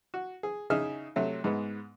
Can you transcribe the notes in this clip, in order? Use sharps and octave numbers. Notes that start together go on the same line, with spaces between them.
F#4
G#4
C#3 D#4 G#4 E5 F6
C3 F#3 A3
G#2 G#3 B3